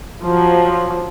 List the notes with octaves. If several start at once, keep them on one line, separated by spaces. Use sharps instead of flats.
F3 F#3